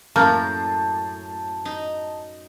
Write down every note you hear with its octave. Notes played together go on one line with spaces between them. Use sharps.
F#2 A2 A#3 A5 G6
D#4